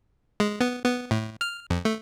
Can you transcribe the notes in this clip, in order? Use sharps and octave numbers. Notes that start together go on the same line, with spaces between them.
G#3
B3
B3
A2
F6
F2
A3